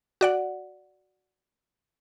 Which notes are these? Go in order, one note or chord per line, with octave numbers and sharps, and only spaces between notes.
F#4 D5 F#5